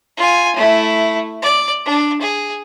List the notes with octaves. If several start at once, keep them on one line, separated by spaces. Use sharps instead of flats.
F4 G#5
A3 E4
D5
D4
G#4